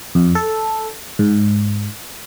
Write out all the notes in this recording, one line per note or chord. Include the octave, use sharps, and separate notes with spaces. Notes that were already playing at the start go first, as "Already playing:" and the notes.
F2
A4
G#2